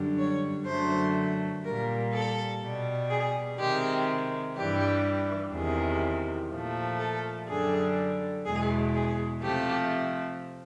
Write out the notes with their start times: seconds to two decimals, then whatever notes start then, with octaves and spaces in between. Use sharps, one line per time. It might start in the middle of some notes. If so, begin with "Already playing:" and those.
Already playing: F#2 D3 G3
0.19 C#5
0.66 F#2 D3 F#3 A3 C5
1.64 A#2 G3 A#4
2.13 A4
2.61 B2 G3
3.10 G#4
3.59 C3 D#3 G#3 G4
4.55 G2 E3 G3 G4
5.52 E2 C3 D#3 G#4
6.50 A#2 F3 A3
6.99 A4
7.47 F#2 D3 G3 G#4
8.45 E2 B2 G#3 G#4
8.94 G#4
9.42 C3 F3 A3 G4